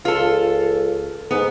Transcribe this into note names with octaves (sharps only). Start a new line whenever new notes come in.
C#2 F4 A4
G#2 B3